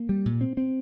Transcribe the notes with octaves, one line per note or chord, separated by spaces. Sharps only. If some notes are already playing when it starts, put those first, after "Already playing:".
Already playing: A#3
G3
A#2
C4
C4